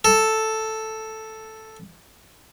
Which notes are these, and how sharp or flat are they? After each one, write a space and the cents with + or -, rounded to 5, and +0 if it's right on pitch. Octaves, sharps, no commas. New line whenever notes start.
A4 +0